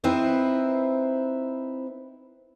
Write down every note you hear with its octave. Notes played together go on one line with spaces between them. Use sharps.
C4 D#4 E4 B4 C5